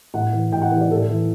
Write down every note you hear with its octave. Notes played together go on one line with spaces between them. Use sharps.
A2 F#5
E3
A2 G5
F#5
E3
D5
A2 A4
E3